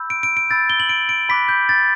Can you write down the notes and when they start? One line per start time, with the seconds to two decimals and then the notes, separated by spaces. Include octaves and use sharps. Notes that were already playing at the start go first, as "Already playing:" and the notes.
Already playing: B5 E6 G6
0.10 D7
0.23 D7
0.37 D7
0.50 B5 E6 G6 A6
0.70 G7
0.80 F#7
0.89 D7
1.09 D7
1.29 B5 D6 F#6 B6
1.48 G6
1.69 A6